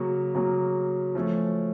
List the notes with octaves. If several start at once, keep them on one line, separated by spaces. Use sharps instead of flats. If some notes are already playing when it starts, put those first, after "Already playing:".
Already playing: C#3 F#3 A#3
C#3 F#3 A#3
F3 A3 C#4